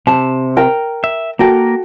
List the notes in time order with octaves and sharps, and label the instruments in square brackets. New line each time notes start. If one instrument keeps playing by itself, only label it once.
[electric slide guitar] C3 [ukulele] A5
[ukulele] A#4 G5 A#5
[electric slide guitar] E5
[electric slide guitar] A#3 A#4 [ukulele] F#4 A4 G5